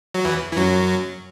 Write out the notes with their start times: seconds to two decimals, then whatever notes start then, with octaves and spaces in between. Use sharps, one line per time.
0.14 F#3
0.25 E2 E3
0.52 E3
0.57 F#2 F#3